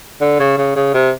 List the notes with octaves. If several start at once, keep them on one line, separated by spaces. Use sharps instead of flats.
D3
C#3
C#3
C#3
C3